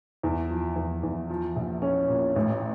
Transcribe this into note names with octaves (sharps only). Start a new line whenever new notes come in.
E2
F3
E2
E2
F3
A#1
C#4
A#2
A1